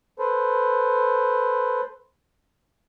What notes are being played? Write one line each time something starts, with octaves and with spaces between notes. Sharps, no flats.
A4 B4 C5